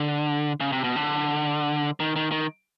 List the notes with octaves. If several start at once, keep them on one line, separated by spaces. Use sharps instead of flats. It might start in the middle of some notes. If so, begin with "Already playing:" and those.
Already playing: D3
C#3
C3
B2
D3
D#3
D#3
D#3